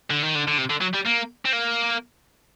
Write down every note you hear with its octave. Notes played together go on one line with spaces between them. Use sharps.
D3
D#3
D3
D3
C3
D3
F#3
G3
A#3
C4
A#3